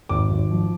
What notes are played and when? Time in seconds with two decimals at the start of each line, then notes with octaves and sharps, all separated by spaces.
0.09 G#1 D6
0.31 G#1
0.51 F3